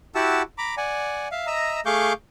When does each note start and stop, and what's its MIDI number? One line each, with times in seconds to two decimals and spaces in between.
0.15 0.42 64
0.15 0.42 66
0.15 0.42 67
0.15 0.42 78
0.15 0.42 81
0.15 0.42 88
0.58 0.75 82
0.58 0.75 83
0.58 0.75 86
0.77 1.28 74
0.77 1.28 78
0.77 1.28 80
1.32 1.46 76
1.32 1.46 77
1.47 1.80 75
1.47 1.80 76
1.47 1.80 82
1.47 1.80 88
1.86 2.13 57
1.86 2.13 68
1.86 2.13 77
1.86 2.13 85
1.86 2.13 86
1.86 2.13 91